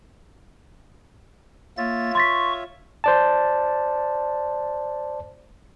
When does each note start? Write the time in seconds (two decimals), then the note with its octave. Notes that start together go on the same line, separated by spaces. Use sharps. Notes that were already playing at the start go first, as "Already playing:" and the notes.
1.78 A#3 F4 C#5 E5 A6
2.15 C6 C#6 A6 B6
3.04 C5 D5 A5